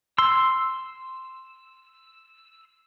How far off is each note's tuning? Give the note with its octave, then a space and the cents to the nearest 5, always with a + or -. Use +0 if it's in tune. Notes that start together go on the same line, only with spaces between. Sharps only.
C6 +0 E6 +0